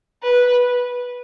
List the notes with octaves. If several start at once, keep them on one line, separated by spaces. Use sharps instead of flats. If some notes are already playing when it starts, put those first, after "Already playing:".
B4